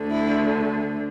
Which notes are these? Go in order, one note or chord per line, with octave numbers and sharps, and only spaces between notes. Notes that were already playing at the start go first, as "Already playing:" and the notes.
Already playing: D2 D3
E4